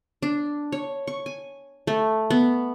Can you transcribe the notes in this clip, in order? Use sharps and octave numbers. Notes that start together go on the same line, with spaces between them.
D4
C#5
C#6
G#5
A3
B3